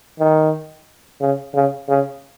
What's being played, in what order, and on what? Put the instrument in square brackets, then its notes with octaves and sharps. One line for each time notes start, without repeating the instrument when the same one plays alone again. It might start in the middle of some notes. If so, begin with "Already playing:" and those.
[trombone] D#3
C#3
C#3
C#3